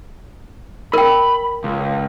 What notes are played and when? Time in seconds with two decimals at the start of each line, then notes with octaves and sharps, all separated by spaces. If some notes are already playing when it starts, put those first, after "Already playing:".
0.94 A#4 G5 B5
1.64 C#2